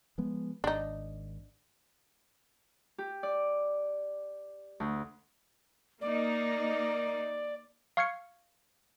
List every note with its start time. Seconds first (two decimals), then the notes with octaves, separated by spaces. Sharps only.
0.18 F3 G#3 B3
0.64 G#1 D4 D#4
2.98 G4
3.23 D5
4.80 D2
6.01 A#3 D#4 D5
7.97 F5 C#6 F6 G#6 C7 C#7